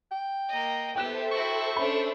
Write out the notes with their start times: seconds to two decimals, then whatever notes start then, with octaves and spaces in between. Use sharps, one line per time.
0.12 G5
0.49 A#3 D#5
0.95 B3 G4 A4 C5 E5 G5 F#6 E7
1.32 E4 F#4 C#6
1.76 C#4 D4 B5